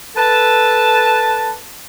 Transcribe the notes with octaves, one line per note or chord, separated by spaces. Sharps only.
A4 B4 A5